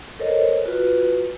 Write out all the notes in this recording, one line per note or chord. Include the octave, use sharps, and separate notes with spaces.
A4 A#4 C5 C#5 D#5
F4 F#4 B4